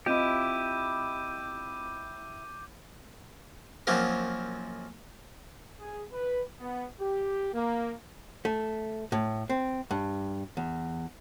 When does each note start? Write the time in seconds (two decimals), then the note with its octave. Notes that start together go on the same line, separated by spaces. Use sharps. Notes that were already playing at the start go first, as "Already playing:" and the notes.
0.06 C4 E4 F4 G4 D#5 D6 G6 D#7
3.87 F#2 F3 F#3 A#3 C4
5.81 G#4
6.12 B4
6.60 B3
7.00 G4
7.53 A#3
8.45 A3
9.12 A2
9.50 C4
9.91 G2
10.57 E2